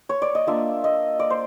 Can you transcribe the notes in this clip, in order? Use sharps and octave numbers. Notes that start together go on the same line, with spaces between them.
C#5
D5
D#5
A#3 D4 F4 E5
D#5
D5
C5